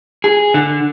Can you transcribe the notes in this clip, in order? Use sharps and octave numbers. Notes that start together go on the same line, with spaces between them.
G#4
D3